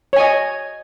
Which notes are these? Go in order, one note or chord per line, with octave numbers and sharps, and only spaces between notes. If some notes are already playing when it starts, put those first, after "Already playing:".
C#5 D#5 G#5